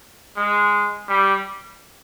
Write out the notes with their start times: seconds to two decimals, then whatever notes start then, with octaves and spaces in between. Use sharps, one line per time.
0.37 G#3
1.08 G3